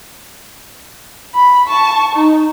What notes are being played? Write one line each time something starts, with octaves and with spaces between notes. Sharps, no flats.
B5
A5 C#6
D#4